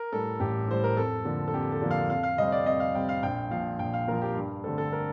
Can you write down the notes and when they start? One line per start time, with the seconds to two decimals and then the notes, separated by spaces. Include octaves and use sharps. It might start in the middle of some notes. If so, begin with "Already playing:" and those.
Already playing: A#4
0.13 A2 G3 A4
0.40 A1 G4
0.68 A2 G3 C5
0.84 A#4
0.97 F2 A4
1.25 D3 F3 A#3
1.48 A4
1.54 F2 G4
1.72 A4
1.82 D3 F3 A#3
1.91 F5
2.10 F2 F5
2.23 F5
2.38 C3 G3 C4 D#5
2.52 D5
2.66 F2 D#5
2.80 F5
2.94 C3 G3 C4 G5
3.09 F5
3.23 A#1 G5
3.51 A#2 F3 F5
3.79 A#1 G5
3.94 F5
4.08 A#2 F3 A#4
4.22 G4
4.35 G2
4.64 D3 A3 C4 A4
4.78 A4
4.93 A#4